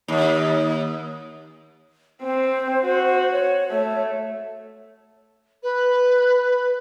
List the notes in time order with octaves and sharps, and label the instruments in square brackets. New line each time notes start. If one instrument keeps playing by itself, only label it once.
[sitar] D#2
[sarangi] C4 [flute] C5
[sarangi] F#4
[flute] C#5
[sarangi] A3
[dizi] B4